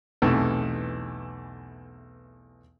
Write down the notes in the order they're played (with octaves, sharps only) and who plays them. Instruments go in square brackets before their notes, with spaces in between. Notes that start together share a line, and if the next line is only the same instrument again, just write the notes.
[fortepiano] B1 E2 C3 E3 A3